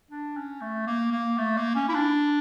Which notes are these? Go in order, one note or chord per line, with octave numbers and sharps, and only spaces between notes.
D4
C#4
A3
A#3
A#3
A3
A#3
C#4
E4
D4